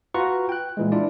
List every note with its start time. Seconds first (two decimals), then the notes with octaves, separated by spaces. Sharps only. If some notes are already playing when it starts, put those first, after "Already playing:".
0.14 F4 F#4 B4 A#5 C#6
0.49 G5 F#6
0.77 A#2 E3 G#3
0.92 D4 E4 F4 D5